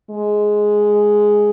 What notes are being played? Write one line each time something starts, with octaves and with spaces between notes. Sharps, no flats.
G#3